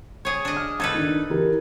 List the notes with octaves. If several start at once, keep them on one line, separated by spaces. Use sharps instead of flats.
G#4 C#5
D4 D#5
F6
D#4 A4 B4 G#6 A6
D#3 D4
E3 G4 A#4